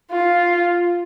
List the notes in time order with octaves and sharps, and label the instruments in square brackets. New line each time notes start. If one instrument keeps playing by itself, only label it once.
[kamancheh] F4